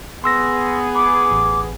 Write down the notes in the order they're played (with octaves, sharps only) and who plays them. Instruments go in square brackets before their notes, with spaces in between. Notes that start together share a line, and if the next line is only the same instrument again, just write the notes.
[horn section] B3 G#4 [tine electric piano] C6 E6 A#6
[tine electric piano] B5 [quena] D6
[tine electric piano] A1